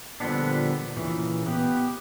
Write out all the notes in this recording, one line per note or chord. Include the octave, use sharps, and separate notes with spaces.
A#2 D3 F3 G3 B3 D4
A#2 C#3 E3
B3 G4